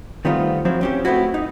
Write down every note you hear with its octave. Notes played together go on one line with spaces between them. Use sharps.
D#3 G3 A3 B3 C4 F4
F3 F#3 C4 E4
C4 C#4 G4
A3 B3 C4 E4 F#4
D#4